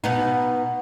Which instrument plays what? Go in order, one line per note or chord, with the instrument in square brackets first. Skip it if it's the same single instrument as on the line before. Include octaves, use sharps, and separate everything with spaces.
[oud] B2 B3 D#4